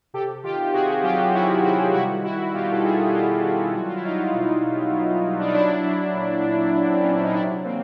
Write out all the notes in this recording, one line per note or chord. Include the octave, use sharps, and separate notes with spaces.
C3 G4 A4
D#3 F4 G4
C3 F#4 G#4
F#3 F4 G4
C3 E4 F#4
D#3 E4 F#4
G3 E4 F#4
G3 E4 F#4
B2 F4 G4
A4
B2 F#4 G#4
G#4
G3 F4 G4
G3 E4 F#4
F#3 F#4
F4
E4
F#3 D#4 F4
B2
B2
F#3
F#3
D4
D#4
F#3 D4 E4
F#3
A#2
A#2
F#3
C4
F#3 C#4
D4
D#4
C3 D4 E4
E3 A#3 C4